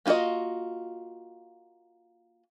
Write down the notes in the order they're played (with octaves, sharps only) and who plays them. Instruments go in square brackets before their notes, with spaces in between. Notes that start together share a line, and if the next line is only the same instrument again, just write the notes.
[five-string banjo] A#3 D#4 F4 F#4 D#5